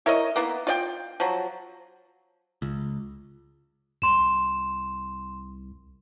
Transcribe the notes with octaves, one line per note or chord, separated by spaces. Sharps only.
E4 A#4 C#5 D#5
A#3 B3 E4
F4 D5 G5
F3 F#3
C#2
C2 C6 E7